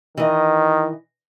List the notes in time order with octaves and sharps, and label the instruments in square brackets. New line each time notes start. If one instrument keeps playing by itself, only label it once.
[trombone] D#3 [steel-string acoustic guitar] E3 D#5